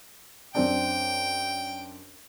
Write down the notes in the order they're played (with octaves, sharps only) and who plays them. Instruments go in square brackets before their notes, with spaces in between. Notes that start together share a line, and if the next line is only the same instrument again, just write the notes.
[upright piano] F#2 C4 D4 [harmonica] G5